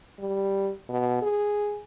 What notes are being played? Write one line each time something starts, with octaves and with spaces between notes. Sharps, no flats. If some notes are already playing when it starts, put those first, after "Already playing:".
G3
B2
G#4